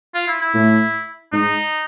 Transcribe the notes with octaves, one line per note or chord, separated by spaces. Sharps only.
F4
E4
E4
A2
G#2 D#4